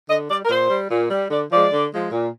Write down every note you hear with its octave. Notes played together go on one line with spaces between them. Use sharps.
D3 D#5
G3 D5
A#4
A#2 C5
G3
A#2
G3
D3 D5
F3 G#3 D5
D3
F3 G#3
A#2